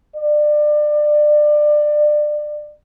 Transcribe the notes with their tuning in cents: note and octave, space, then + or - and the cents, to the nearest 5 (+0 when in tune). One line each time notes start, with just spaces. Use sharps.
D5 +25